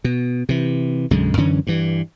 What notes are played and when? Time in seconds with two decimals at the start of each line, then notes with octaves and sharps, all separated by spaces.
0.04 B2
0.49 C3 E3
1.11 B1 F#2 D3 G#3
1.37 F#2 D3 E3 C#4
1.67 G2 E3